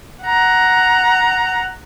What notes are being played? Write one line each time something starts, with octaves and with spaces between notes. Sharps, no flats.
F#5 A#5